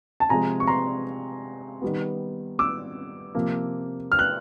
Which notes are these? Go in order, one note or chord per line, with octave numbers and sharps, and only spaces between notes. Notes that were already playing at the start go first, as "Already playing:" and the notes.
A5
C3 F3 G#3 G#5 A#5
C#6
A#5 C6
D#3 G3 B3
D6 E6
C3 F3 A#3
F6
F#6